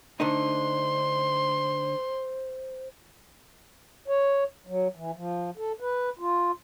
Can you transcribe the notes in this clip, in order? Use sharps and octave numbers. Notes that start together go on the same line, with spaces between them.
D3 A3 D#4 C5 C6
C#5
F#3
E3
F3
A4
B4
F4